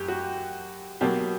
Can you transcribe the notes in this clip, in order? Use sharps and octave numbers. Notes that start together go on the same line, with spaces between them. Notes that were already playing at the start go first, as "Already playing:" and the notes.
Already playing: F#2 G4
F#4
B2 F#3 A#3 G4